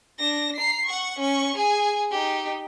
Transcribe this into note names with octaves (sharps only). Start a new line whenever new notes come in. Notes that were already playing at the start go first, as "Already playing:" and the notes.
D4 A#6
A#5 C7
F#5 C#6
C#4 C#6
G#4 G#5
D#4 G4